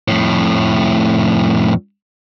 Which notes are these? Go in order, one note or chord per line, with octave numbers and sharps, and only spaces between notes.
F2 A2